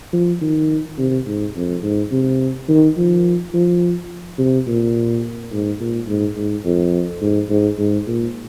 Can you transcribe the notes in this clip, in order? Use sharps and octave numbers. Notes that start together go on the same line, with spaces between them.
F3
D#3
C3
G#2
F2
G#2
C3
D#3
F3
F3
C3
A#2
G#2
A#2
G#2
G#2
F2
G#2
G#2
G#2
A#2